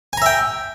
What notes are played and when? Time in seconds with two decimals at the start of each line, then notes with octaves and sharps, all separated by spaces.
0.13 G#5
0.17 A#5
0.22 E5
0.26 G5